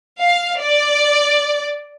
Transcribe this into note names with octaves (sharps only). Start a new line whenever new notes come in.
F5
D5